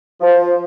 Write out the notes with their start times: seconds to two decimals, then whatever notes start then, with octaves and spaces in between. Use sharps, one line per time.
0.21 F3